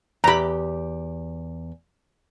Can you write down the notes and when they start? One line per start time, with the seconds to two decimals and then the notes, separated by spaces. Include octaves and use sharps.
0.24 E2 G4 A#5 B5